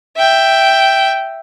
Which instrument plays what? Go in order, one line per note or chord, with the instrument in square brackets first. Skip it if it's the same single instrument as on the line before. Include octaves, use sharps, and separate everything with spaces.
[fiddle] E5 G5